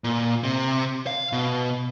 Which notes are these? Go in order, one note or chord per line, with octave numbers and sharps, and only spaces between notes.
A#2
C3
F5
B2